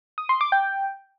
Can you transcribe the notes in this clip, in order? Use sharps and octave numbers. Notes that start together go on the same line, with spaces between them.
D#6
C6
D6
G5